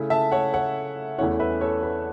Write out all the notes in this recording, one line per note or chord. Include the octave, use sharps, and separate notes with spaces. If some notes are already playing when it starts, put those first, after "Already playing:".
Already playing: C#3 A3 E4
E5 A5
C#5 F#5
C#5 F#5
E2 E3 A3 C#4 E4 C#5 F#5
B4 E5
A4 C#5
B4